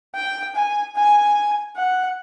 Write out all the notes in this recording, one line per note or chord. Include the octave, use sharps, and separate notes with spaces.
G5
G#5
G#5
F#5